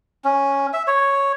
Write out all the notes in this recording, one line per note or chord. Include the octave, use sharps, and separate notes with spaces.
C#4
E5
C#5